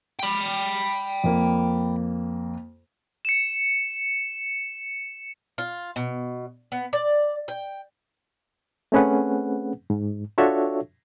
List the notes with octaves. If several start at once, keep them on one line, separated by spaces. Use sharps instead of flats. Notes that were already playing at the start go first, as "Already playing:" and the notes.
G5 B5
F2 A#3
C#7 E7
F4
B2
B3
D5
G5
A3 C4 C#4 G#4 B4 F#5
G#2
D4 F4 F#4 A4 C#5 E5